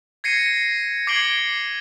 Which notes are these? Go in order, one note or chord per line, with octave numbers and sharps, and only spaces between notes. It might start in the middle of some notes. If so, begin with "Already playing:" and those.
G#6 A#6 C7 C#7 D#7
D6 G#6 C7 D7 F#7 G7